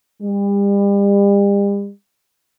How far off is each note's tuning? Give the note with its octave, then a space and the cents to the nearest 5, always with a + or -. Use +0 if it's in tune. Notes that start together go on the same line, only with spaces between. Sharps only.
G3 +40